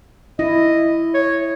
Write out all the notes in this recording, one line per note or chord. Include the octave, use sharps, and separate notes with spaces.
E4 D#5
C#5